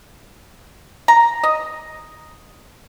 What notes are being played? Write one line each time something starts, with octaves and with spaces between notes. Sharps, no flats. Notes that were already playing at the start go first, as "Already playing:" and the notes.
A#5
D#5